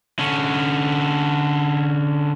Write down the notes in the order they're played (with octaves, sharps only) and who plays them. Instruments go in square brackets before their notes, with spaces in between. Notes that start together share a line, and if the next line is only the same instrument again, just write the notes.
[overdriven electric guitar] D3 C#4